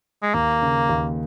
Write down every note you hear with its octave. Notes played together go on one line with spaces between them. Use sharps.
G#3
D#2 A#3
C#3
D#2